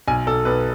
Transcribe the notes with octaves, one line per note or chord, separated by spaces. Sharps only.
B1 G#5
B1 A4
B1 B4